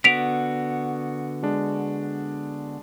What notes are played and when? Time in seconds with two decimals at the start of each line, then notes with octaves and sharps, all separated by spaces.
0.04 D3 B3 F#4 B6 D7 F7
1.43 G#3 D4